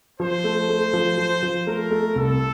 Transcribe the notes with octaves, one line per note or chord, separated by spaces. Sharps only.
F3 C5
A3
A3
F3
F3
F3
A3 A#4
A3
C2 A4